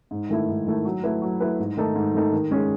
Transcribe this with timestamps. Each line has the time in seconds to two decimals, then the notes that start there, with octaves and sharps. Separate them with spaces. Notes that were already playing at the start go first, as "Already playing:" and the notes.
0.11 G#2
0.29 D#3 A3 E4
0.48 G#2
0.67 D#3 A3 E4
0.85 F#3
1.03 A3 E4 B4
1.22 F#3
1.40 A3 E4 B4
1.59 G#2
1.77 D#3 A3 D#4 A4
1.95 G#2
2.14 D#3 A3 D#4 A4
2.32 D#3
2.51 G#3 C#4 G#4